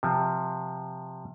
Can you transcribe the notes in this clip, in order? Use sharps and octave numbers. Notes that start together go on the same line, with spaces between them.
C3 F3